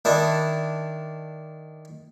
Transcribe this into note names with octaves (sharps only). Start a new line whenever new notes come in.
D#3 D4 E4